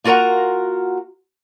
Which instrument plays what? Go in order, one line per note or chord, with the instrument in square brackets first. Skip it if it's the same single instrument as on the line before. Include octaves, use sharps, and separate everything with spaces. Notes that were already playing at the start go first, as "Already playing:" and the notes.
[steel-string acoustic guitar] A#3 F4 F#4 A#4 F#5 A#5